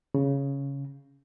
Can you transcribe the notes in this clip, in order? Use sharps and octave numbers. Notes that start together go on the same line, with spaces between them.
C#3